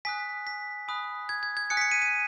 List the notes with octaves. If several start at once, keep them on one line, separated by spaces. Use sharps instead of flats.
G#5 D#6 F#6 B6
B6
G#5 B5 D#6 F#6
G#6
G#6
G#6
G#5 D#6 F#6 C#7
B6
C#7
D#7
D#7